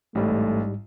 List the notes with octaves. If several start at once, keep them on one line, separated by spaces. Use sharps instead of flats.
A1 G#2 G3 A3